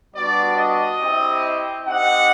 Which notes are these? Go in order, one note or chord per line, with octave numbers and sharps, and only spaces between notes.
G3 B3 D4 F#4 D5
D#5
C4 E4 G4
C4 D#4 G4 F#5